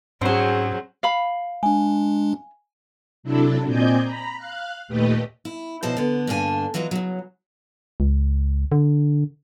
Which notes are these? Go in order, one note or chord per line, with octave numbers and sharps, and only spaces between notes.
G#2 F#3 C4 C#4 G#4 C5
F5 B5
G#3 D4 G#5
C3 F#3 D4 E4 A4
A#2 C4 D5 D#5 G#5 G6
A#5 B5
F5 F#6
D#2 A#2 A3 G4 B4 D#5
E4
B2 F3 F#3 E4 C5 A5
D3 B3
G2 D3 A#3 D4 G#5
E3 F#3 G#3 F4 F#4
C#3 F#3
C#2
D3